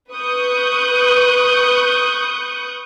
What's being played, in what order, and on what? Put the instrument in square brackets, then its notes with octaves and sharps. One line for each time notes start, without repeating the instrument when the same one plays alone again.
[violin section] B4 C#6 D#6 F#6 G6